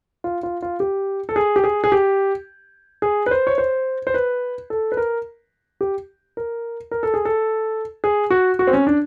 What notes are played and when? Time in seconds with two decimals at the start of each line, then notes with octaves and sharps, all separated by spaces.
0.24 F4
0.43 F4
0.62 F4
0.80 G4
1.29 A4
1.36 G#4
1.56 G4
1.64 G#4
1.84 G#4
1.92 G4
3.02 G#4
3.26 B4
3.31 C5
3.47 C#5
3.58 C5
4.07 C5
4.14 B4
4.70 A4
4.92 B4
4.97 A#4
5.81 G4
6.37 A#4
6.91 A#4
7.03 A4
7.14 G#4
7.25 A4
8.04 G#4
8.30 F#4
8.59 F#4
8.67 C4
8.73 C#4
8.87 D4